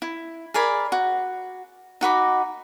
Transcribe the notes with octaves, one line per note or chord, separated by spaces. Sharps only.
E4
G#4 A#4 D5 B5
F#4
D#4 F#4 B5 D6